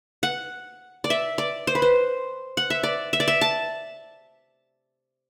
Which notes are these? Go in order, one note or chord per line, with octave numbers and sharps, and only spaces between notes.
F#5
D5
E5
D5
C5
B4
C5
F#5
E5
D5
E5
D5
E5
A5